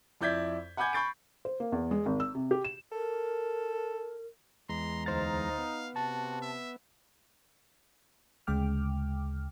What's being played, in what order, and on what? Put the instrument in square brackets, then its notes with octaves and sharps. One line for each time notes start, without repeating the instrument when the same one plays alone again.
[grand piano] F2 E4 D5 G6 G#6 B6
F#5 G#5 B5 D6 G6 G#6
B5 C#6 G6 A6 C7 D7
[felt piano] C5
A#3
E2
G#3
G#1
E6
C3
G4
E7
[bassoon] A4 [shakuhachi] A#4
[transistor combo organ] E2 G#3 A#5 [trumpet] C6
[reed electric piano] D2 C5 A6 [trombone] D#4 [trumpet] F5
[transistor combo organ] B3
[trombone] C3 [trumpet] F#4 [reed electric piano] A5
[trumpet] E5
[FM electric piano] D2 C#3 G#3 G5 D6 F6